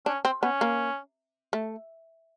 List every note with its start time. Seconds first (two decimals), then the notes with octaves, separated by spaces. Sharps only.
0.06 C#4 D4
0.25 C4
0.42 B3 C#4
0.61 A#3
1.53 A3